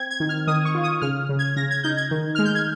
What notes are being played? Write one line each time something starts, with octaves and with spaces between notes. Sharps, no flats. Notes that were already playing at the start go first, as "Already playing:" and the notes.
Already playing: C4 G#6
G#6
D#3
F6
D#3 D#6
C#6
F4
D#6
C#3 F6
C#3
G#6
C#3 A#6
G#6
D#4 G6
G#6
D#3
G#3 F6
G6
G#6